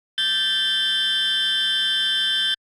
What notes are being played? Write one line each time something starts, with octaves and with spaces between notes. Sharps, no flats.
G6 A6